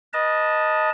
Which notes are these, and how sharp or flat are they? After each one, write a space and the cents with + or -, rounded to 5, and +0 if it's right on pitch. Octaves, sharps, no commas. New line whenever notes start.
B4 -35 D#5 +0 A5 +0